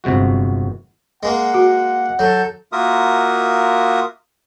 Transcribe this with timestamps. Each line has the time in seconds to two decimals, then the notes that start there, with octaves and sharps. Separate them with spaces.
0.04 G1 F2 C3 G#3 F#4
1.23 G#3 A#3 F#5
1.54 F#4
2.19 F#3 A4 G6
2.72 A#3 F4 F#4 A#4 E5 D#6